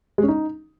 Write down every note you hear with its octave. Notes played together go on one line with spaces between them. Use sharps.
G#3
C#4
D#4